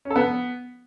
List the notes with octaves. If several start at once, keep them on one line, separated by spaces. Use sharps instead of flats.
C#4
A4
B3